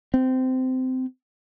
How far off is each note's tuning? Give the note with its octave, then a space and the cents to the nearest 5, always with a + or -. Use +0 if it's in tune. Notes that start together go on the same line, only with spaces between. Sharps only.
C4 -20